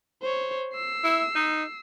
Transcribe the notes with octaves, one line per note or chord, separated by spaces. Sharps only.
C5 C#5
E6 C7
E4
D#4